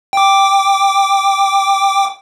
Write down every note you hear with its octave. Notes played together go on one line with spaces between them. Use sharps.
G5 D6